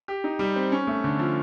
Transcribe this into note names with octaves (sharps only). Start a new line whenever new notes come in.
G4
D#4
G3
C4
C#4
A3
D3
F3